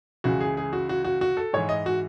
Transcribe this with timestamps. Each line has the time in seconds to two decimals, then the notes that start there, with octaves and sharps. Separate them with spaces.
0.24 C#2 C#3 E3 F#4
0.40 G#4
0.57 G#4
0.73 F#4
0.89 F#4
1.04 F#4
1.21 F#4
1.37 A4
1.53 G#2 E3 C#5
1.69 D#5
1.86 F#4